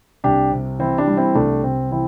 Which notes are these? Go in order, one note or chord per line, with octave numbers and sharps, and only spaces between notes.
C2 D4 G4
C3
E3 C4 E4
D4 G4
G3
C4 E4
C2 A3 D4
C3 C4
E3 C4 E4